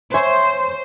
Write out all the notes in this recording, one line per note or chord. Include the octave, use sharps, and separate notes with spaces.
C5 C#5 E5 G#5